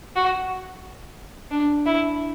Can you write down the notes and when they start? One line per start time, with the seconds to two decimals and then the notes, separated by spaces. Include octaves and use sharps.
0.16 F#4
1.52 D4
1.86 E4